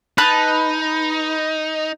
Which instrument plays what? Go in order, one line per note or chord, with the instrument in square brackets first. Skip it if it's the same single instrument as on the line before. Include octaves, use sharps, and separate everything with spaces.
[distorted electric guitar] D#4 [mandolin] B4 A5 F#6